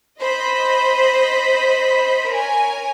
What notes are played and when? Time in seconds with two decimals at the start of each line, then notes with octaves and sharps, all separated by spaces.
0.21 C5 D#5 B5
2.29 A#4 C#5 G#5